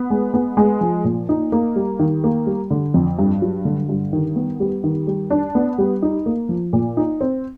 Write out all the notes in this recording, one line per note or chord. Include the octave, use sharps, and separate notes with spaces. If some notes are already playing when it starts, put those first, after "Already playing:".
Already playing: B3
G#3
B3
G#3
F3
A#2
D#4
A#3
G3
D#3
A#3
G3
D3
F2
G2
F#3
D3
G2
D#3
B3
G3
D#3
G3
D4
B3
G3
D#4
A#3
F3
A#2
D#4
C4